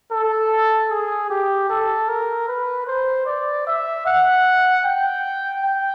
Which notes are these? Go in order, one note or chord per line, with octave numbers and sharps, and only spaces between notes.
A4
G#4
G4
A4
A#4
B4
C5
D5
E5
F#5
G5
G5